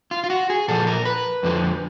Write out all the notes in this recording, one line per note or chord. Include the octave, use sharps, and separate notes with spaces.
F4
F4
F#4
G#4
A#2 F3 A4
A#4
B4
F2 D3 F3